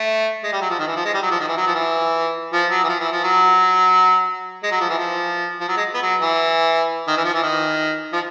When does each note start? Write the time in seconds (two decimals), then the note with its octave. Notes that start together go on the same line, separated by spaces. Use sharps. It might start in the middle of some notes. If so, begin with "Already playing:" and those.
Already playing: A3
0.43 G#3
0.52 G3
0.61 F#3
0.70 F3
0.79 D#3
0.87 E3
0.96 F3
1.05 G#3
1.14 G3
1.22 F#3
1.31 F3
1.40 D#3
1.48 E3
1.57 F#3
1.66 F3
1.75 E3
2.53 F3
2.71 F#3
2.84 E3
2.89 F3
3.00 E3
3.12 F3
3.23 F#3
4.63 G#3
4.71 F#3
4.80 F3
4.89 E3
4.98 F3
5.60 F3
5.68 F#3
5.77 G#3
5.94 B3
6.03 F#3
6.20 E3
7.08 D#3
7.17 E3
7.25 F3
7.34 E3
7.43 D#3
8.13 F3